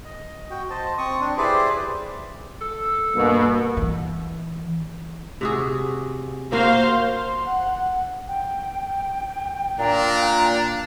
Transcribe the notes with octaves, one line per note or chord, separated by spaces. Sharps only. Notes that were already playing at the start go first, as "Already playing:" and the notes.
D#5
F#4 G5
C5 D#5 A5
C4 C#6 D#6
C4 D4
E4 G4 G#4 B4 C5 D5
A4
G2 B2 A#3
E3
C3 F#4 G#4
A#3 F#4 C5 F5
C6
F#5
G5
A#2 D4 A#5